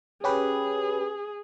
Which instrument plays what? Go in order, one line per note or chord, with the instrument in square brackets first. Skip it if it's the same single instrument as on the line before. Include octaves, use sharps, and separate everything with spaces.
[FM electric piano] C#4 G4 B4 [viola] G#4